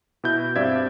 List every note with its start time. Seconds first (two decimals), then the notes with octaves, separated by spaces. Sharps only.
0.24 B2 E4 G6
0.56 G2 C4 D5 E5 F5 G#6